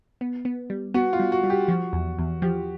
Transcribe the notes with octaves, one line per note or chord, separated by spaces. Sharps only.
B3
B3
G3
B3 F#4
F4
G3
F#4
G3
G4
F3 F#4
E2
E2
F3 G4